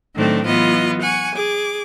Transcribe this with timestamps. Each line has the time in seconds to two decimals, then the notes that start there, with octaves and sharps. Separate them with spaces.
0.14 A2 D#3 F#3 A3 C4 D4
0.45 E3 F#3 B3 F4 D#5
1.01 F#5 G#5 C#6
1.34 G#4 D6